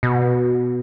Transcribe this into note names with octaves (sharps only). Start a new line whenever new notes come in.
B2